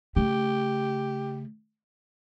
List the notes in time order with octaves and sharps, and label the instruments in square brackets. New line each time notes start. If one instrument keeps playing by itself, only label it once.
[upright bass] C#3 A3 [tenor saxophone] G4